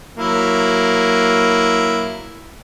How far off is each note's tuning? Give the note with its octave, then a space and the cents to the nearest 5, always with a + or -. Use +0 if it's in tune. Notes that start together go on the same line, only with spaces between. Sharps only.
F#3 +0 A#3 +0 E4 +0